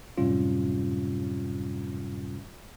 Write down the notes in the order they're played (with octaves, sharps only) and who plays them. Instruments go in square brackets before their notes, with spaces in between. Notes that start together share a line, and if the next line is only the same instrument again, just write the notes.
[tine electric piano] F#2 A2 C3 G3 C#4 F4